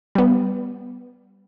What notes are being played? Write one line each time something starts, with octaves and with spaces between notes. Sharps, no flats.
G3 B3